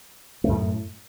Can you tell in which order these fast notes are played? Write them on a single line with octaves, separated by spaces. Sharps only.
A3 F#2 A2